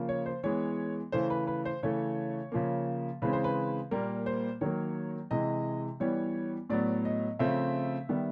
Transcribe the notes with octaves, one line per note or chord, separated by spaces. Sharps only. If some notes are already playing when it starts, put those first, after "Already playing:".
Already playing: C#3 F3 A#3
C#5
C5
E3 G#3 B3 C#5
C#3 E3 A3 C5
B4
B4
C5
C#3 E3 A3 C#5
C#3 F3 A#3
C#3 E3 G#3 C4 B4
C5
B4
A#2 G3 A#3 A#4
C5
D#3 F#3 A#3 C#5
C3 E3 G#3 D#5
E3 G3 B3 C#5
A2 F#3 B3 D5
D#5
C#3 F3 A3 C4 E5
D#3 G3 B3